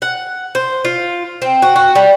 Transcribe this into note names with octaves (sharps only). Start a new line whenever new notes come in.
F#5
C5
F4
C4
F#4
F#4
G3